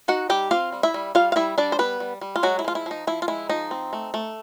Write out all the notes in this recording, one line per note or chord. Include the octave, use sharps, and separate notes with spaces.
D#4 F#4 F#5
G3 G4 G5
C4 F4 F5
G3
E4 E5
G3
G3 F4 F5
F5
G3 E4 E5
G3 D4 D5
C5
G3 B3 B4
G3
G3
F4
F#3 G#3 F#4
E4
F3 F4
E4
F3 D#4
F3 E4
F4
G#3 E4
F3 D#4
C4
A3
A3